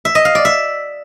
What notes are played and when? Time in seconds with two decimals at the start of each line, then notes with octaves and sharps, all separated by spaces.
0.05 E5
0.15 D#5
0.25 F5
0.35 D5
0.45 E5